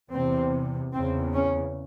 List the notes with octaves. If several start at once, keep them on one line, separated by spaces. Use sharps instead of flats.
E2 C3 C4
E2 C#3 C4
C#4